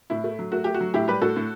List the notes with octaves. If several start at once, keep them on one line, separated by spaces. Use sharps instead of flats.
A2 E4
A3
F#3
A3 F#4
A3 G4
F#4
F#3
A2 E4 G4
G3 G4 B4
A2 F#4 A4
A2